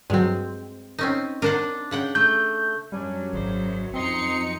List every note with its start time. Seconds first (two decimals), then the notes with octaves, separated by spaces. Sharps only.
0.10 G2 F#3 G#3 C4
0.99 C4 C#4 D#4
1.42 D4 A#4 C5 F#5
1.91 C#3 F#5 G5
2.15 A3 G6
2.92 F#2 F#3 G3 C#4 D4
3.33 G#1 C#3 C5 D5
3.94 F2 C4 D#4 D#5 C6 C#7